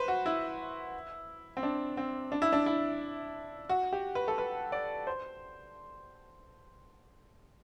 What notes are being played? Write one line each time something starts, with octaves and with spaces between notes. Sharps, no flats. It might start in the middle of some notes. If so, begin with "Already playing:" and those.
Already playing: B4 C5
F#4
E4
C4
D4
C4
D4
E4
D4
E4
F#4
G4
B4
A4
B4
D5
C5